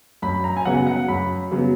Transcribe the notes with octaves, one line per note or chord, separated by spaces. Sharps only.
F#2 B5
A#5
G#5
C#3 F#3 B3 F#5
F#5
F#2 B5
C#3 F#3 B3